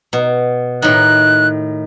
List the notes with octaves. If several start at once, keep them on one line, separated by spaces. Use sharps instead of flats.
B2
A2 D#3 F#6